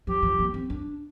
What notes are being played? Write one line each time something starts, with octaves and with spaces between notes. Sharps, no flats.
F3 G4
F3
A#3
C4
D4